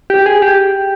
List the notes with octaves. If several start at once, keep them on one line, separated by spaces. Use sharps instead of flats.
G4
G#4
G4